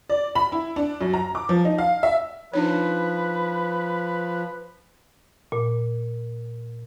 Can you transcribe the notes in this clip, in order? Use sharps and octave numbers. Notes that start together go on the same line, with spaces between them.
D5
B5
E4
D4
F#2
A#5
D6
F3
D#4
F5
E5
F3 D4 D#4 B4 C#5
A#2